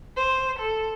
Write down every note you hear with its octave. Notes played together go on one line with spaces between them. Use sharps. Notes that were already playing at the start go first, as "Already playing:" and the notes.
C5
A4